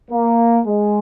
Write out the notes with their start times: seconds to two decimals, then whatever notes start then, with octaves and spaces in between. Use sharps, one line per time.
0.11 A#3
0.66 G#3